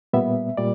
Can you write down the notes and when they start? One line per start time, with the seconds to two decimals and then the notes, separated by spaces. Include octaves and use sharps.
0.13 A#2 G3 B3 E5
0.57 A#2 G3 D5